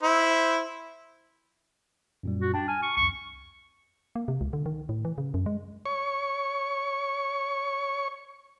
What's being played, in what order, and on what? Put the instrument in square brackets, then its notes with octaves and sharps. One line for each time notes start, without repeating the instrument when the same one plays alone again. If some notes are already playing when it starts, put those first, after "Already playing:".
[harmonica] E4 C5
[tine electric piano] F#2 A#2 G3
[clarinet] F#4
[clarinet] D4 [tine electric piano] G5 A5
[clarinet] G#5 [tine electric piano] F6
[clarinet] C#6
[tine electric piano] C2 F2 [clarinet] C#6
[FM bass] A#3
C3
C#2
D3
D#3
A2
E3
C#3
F#2
G#3
[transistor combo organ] C#5 C#6